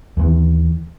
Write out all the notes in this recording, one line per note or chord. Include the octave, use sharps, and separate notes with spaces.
D#2 E3